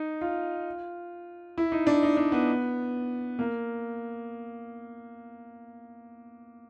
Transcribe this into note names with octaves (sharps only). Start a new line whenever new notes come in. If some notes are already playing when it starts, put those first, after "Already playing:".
Already playing: D#4
F4
E4
D#4
D4
D#4
D4
B3
A#3